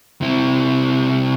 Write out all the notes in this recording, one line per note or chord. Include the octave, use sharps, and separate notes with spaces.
C3 E4